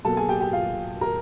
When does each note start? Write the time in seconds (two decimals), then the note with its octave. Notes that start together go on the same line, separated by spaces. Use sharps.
0.05 B2 F#3 A#3 A4 A5
0.17 G#4 G#5
0.29 G4 G5
0.41 G4 G5
0.53 F4 F5
1.01 A#4 A#5